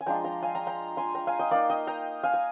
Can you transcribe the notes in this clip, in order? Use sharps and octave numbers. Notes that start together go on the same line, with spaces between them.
G#5
F3 G#3 D4 F4 G5 A#5
G5 A#5
F5 G#5
G5 A#5
G5 A#5
G#5 C6
G5 A#5
F5 G#5
D#5 G5
A#3 D#4 D5 F5
D#5 G5
G5 A#5
F5 G#5
G#5